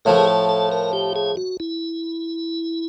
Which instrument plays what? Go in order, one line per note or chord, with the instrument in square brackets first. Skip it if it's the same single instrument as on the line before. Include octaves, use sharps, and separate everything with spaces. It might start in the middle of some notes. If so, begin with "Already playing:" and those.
[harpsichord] A2 F3 A3 [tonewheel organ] A#4
[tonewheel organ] G#4
A4
A4
A#4
G4
G#4
F#4
E4